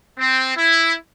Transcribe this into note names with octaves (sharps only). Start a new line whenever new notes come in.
C4
E4